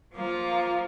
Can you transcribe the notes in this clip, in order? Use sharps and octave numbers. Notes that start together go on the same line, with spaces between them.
F3 A#3 F4